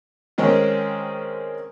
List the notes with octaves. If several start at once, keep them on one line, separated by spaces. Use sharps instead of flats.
D#3 G#3 C4 C#4